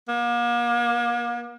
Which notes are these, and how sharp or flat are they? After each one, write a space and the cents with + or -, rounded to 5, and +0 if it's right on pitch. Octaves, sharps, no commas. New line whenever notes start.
A#3 +40